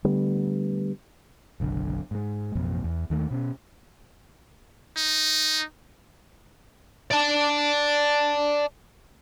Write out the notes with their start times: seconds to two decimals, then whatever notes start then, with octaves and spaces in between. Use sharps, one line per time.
0.04 D3 G3 A3 B3
1.60 F#1 B1 D3
2.11 G#2 G#3
2.55 A1 F2 B2
2.84 E2
3.10 D#2 D#3 A3
3.31 B2 C#4
4.97 D#4
7.11 D5 A5